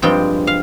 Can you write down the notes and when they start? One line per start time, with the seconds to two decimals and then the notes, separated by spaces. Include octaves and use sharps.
0.02 G2 F3 G#3 C4 G5
0.47 F5